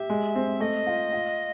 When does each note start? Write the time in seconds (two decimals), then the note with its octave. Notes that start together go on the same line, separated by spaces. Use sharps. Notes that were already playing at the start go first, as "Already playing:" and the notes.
Already playing: G4 E5
0.10 G#3
0.35 C4
0.60 A3 D#5
0.87 F4
1.13 F4